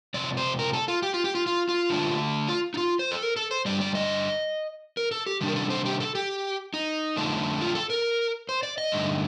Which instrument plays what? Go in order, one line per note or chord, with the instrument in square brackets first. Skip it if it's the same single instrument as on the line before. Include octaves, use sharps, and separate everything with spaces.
[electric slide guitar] F2 C3 D5
C5
A#4
A4
F4
G4
F4
G4
F4
F4
F4
D3 A3 D4
F4
D#4
F4
C5
A4
A#4
A4
C5
G2 D3 G3 D5
D5
D#5
A#4
A4
G4
C3 D#3 G3 D4
A#4
A4
C5
G4
A4
G4
D#4
F2 D3 A3 D4
F4
A4
A#4
C5
D5
D#5
G2 D3 A3 D#4